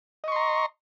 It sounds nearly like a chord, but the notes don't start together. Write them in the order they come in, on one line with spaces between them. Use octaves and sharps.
D#5 C#6 C6 A#5